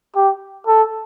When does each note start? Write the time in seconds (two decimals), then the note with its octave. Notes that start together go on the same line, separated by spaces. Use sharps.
0.16 G4
0.67 A4